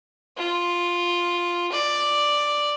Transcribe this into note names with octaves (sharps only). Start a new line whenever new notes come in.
F4
D5